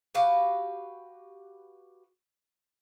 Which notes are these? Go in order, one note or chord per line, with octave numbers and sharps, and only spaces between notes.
F#4 G4 B4 F5